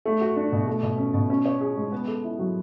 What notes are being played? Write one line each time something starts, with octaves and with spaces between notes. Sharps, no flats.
A3
F#4
D4
B2
A3
B2
C#4
B2
C#4
C#5
G#4
G#3
B3
A4
E4
F#3